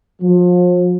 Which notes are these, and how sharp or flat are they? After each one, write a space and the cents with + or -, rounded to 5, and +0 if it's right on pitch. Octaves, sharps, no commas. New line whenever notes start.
F3 +35